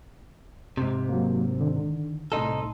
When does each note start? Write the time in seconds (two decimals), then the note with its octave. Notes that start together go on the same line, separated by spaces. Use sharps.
0.77 G#2 C3
1.09 F#3 A#3
1.60 D3 D#3
2.32 C2 A2 D#4 A4 C6